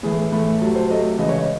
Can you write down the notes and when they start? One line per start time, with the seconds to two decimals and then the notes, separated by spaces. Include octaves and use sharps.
0.03 A2 E3 A3 G#4
0.32 A2 E3 A3
0.62 C3 F#3 A3 A4
0.75 C5
0.90 C3 F#3 A3 D#5
1.18 C#3 E3 G#3 D#5
1.29 C#5
1.38 D#5